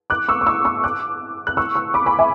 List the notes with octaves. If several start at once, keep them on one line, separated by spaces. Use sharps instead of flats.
D6 F#6
C#6 E6
D6
C#6 E6
C#6 E6
D6 F#6
F#6
C#6 E6
C#6 E6
B5 D6
G#5 B5
E5 G#5